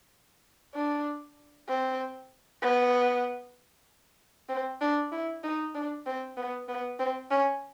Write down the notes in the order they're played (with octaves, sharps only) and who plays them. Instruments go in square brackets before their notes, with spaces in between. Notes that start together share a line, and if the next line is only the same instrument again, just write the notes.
[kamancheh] D4
C4
B3
C4
D4
E4
D#4
D4
C4
B3
B3
C4
C#4